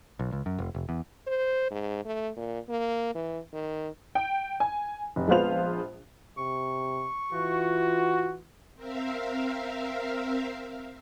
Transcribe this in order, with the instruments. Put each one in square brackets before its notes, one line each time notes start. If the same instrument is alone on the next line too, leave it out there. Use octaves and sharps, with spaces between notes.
[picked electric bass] B1
C#2
F#2
F1
F1
E2
[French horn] C5
G#2
A3
A#2
A#3
E3
D#3
[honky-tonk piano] G5
G#5
F1
A#1 G#3 B3 F4 C5 F7
[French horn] C3 [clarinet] C#6
[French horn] E3 [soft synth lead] F4 [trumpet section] F#4
[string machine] C4 A#4 E5 F5